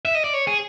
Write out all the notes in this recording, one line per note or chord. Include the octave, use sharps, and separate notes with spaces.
E5
D#5
D5
C#5
G#4